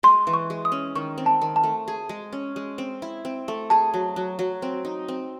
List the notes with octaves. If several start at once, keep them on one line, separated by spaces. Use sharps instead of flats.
G#3 C6
E3
C#6
G#3
D#6
C#4
D#3 C#6
C4
A5
D#3
A5
A3
G#4
G#3
C#4
G#3
C4
E4
C4
A3
G#4 A5
F#3
F#3
F#3
C4
D#4
C4